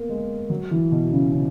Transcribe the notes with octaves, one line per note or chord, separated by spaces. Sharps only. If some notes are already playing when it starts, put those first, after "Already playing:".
Already playing: A#3 B3
G#3
F#3
E3
B2
C#3
C#3